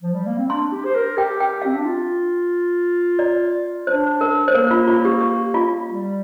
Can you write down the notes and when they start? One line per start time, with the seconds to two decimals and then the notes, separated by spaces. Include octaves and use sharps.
0.02 F3
0.14 G3
0.26 A#3
0.38 C4
0.50 D4 C6
0.72 G4
0.85 C5
0.95 A#4
1.17 G4 G5
1.40 G5
1.62 C4 F5
1.75 D4
1.85 F4
3.19 D5
3.87 D4 C5
4.21 A#4
4.48 C5
4.54 A#3 A#4
4.71 F4
4.88 F4
5.05 G4
5.21 G4
5.54 F4
5.89 G3